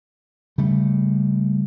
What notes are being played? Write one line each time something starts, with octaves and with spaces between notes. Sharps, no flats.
C#3 G3 A3